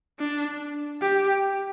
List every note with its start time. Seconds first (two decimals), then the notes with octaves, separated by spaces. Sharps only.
0.19 D4
1.02 G4